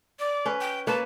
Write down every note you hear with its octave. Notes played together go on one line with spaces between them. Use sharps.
D5
C#4 B4
G5
A#3 B4 C#5 A5